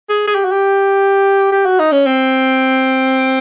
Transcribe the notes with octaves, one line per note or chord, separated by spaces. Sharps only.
G#4
G#4
G4
F#4
G4
G4
F#4
D#4
C#4
C4